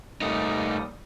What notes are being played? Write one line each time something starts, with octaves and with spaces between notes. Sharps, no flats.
D#2 G3 A3 D#4 D#6